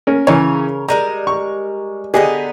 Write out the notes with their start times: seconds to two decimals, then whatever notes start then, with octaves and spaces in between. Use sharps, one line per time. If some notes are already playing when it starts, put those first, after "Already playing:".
0.07 A#3 C#4 A#4
0.27 C#3 E3 C#4 A#4 C#5
0.88 G3 G#3 A#4 A#5
1.27 C#6
2.14 D3 B3 D#4 G4 G#4 D#5